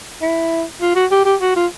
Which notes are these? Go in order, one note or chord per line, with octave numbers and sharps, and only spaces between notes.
E4
F4
F#4
G4
G4
F#4
F4